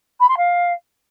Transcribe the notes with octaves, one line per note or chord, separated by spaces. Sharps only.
B5
C6
F5